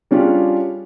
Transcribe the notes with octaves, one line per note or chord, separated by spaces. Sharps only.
G3 C#4 D4 F4 G4 G#4